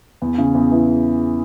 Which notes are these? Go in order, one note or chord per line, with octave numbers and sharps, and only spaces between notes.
E2
C#3
E2
E3